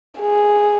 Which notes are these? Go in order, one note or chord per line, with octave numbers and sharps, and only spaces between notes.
G#4